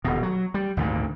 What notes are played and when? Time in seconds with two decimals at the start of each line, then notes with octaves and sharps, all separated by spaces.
0.04 D#1 B2
0.23 F#3
0.54 G3
0.77 G#1 D2 A#2 D3